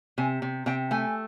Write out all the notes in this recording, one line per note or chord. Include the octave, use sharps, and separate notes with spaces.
C3 G#5
C3
C3 G5
A3 G#5